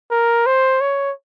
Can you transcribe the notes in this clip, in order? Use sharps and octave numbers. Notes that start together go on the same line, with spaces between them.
A#4
C5
C#5